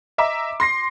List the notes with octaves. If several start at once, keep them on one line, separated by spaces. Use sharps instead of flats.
D#5 E5 A#5 D6
C6 A#6 C7